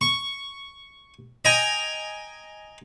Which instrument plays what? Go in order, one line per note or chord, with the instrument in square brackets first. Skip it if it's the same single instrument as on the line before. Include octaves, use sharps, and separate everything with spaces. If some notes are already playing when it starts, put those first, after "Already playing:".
[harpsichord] C#6
D#5 G5 G#5 A#5